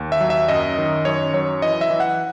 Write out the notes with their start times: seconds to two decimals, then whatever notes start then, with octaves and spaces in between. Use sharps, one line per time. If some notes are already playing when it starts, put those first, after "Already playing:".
Already playing: D#2
0.12 E5
0.21 F#3
0.30 E5
0.48 F#2 D#5
0.78 D#3
1.05 F#2 C#5
1.33 F#3 C#5
1.62 E3 D#5
1.81 E5
1.90 E3
2.00 F#5